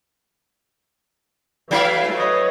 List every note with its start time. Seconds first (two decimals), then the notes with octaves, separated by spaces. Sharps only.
1.71 E3 F#3 A3 E4 F5
2.13 B4 C#5 D#5